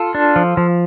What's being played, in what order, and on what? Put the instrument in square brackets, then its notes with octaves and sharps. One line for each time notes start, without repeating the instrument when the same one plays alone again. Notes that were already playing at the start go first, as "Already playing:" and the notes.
Already playing: [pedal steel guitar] F4 A4
D4
F3
F3